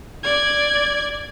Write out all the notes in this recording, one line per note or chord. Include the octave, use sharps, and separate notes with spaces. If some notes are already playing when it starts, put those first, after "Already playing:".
D5 G#6